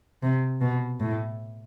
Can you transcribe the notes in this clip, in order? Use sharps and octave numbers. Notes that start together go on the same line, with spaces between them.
C3
B2
A2